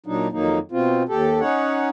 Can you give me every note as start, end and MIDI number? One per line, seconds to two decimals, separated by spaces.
0.06 0.28 46
0.06 0.28 54
0.06 0.28 62
0.06 0.28 63
0.32 0.59 41
0.32 0.59 51
0.32 0.59 54
0.32 0.59 58
0.32 0.59 63
0.72 1.03 47
0.72 1.03 60
0.72 1.03 65
1.09 1.40 39
1.09 1.40 67
1.09 1.40 69
1.40 1.89 61
1.40 1.89 63
1.40 1.89 73
1.40 1.89 78